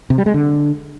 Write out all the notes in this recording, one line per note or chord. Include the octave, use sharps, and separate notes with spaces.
C3
G3
G#3
D3